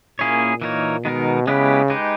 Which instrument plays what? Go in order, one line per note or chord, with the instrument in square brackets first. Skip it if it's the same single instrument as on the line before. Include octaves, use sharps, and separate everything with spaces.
[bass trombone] A#2 [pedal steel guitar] A#3 C#4 E4 G#4 C#5
[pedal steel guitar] E3 A#3 D#4 A#4 C#5
[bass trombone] B2 [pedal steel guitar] D#3 G#3 B3 D#4 A#4
[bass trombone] C#3 [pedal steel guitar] G#3 B3 E4 G4 B4
[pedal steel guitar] G#3 D#4 G4 B4